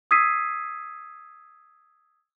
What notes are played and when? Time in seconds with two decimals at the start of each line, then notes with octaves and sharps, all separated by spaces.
0.11 D#6 E6 G#6 B6 C7 D#7